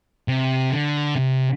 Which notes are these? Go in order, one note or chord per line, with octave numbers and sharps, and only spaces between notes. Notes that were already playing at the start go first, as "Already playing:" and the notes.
C3
D3
C3